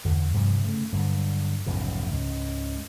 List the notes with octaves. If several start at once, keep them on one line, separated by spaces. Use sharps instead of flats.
E2 D3
G2 C3 F3 G3
C#3 A3
G2 D3 F#3
F1 B1 G#2 C#3
C#2 G#2